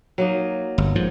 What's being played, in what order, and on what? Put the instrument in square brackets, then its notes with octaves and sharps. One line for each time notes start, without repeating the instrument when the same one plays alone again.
[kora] F#3 A#3 D#4
[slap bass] G1
G#2 F3